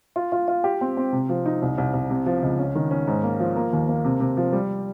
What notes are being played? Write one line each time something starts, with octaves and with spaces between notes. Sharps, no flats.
F4
F4
F4
G4
C4
C4
C3
F3
D#4
C2
C2
C2
C3
F3
C#2
C#4
D#3
C#4
G#2
A#3
F3
A#3
D#2
A#3
C3
C3
F3
G3